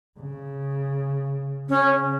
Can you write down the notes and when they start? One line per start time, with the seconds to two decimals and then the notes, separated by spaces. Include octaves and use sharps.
0.19 C#3
1.69 C#3 C#4